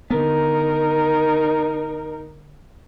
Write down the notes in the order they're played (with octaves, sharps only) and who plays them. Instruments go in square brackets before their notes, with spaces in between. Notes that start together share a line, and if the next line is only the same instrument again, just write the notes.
[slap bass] D3 B3 [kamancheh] D#4 A#4